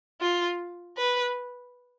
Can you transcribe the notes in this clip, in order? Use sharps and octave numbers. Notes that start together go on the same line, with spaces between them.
F4
B4